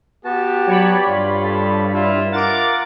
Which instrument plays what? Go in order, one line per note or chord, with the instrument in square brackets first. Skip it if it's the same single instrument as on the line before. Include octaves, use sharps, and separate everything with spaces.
[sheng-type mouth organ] B3 F#4 A5 [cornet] G4
[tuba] F#3 [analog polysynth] C#5 D5 B5
[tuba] G2 [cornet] F4
[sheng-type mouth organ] A4
[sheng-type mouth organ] E4 E5 [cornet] F4
[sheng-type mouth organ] F4 F#5 [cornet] A#4 [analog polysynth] D6 A6